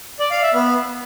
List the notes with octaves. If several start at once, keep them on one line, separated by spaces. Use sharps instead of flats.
D5
F5
E5
B3